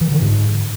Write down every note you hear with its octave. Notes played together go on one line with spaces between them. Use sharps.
E3
D3
G#2